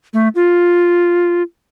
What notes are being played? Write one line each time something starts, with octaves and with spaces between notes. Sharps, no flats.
A3
F4